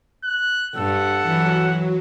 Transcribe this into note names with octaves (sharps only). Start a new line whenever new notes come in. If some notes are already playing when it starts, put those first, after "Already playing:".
F#6
G2 A4 F#5
E3 F#3